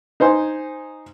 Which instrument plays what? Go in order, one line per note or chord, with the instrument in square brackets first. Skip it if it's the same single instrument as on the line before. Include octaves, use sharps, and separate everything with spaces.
[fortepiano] D#4 C5 G#5 C6